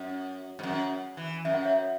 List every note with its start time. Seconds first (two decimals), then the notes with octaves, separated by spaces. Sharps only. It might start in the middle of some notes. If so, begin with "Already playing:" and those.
Already playing: F#2
0.59 G#2
0.63 F#2
1.17 E3
1.45 F#2 E5
1.54 F#5
1.65 C#5 E5